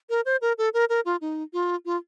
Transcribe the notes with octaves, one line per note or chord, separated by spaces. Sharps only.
A#4
C5
A#4
A4
A#4
A#4
F4
D#4
F4
F4